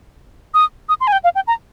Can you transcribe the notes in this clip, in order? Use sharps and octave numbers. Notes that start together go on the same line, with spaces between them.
D#6
D#6
C6
G#5
G5
F5
G5
A#5